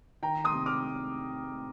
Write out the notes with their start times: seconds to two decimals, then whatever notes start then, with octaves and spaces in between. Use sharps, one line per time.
0.23 D#3 G5 A#5
0.44 C6 D#6
0.52 C3
0.66 D6 F6